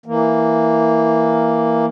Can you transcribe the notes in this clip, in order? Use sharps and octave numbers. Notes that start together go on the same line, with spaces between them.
E3 A#3